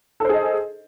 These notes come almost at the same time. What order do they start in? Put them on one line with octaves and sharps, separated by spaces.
A4 C5 G#4 D#5